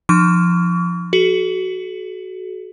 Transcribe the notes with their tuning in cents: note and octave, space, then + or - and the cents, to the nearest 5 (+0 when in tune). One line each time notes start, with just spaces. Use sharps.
F3 +0 D#4 -40 C#6 +40
F#4 +10 A4 -45